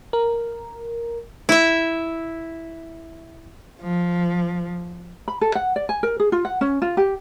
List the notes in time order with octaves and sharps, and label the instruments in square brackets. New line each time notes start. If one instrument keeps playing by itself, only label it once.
[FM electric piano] A#4
[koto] E4 E5
[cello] F3
[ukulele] B5
A4
F#5
D5
G#5
A#4
G#4
F4
F#5
C#4
F4
G4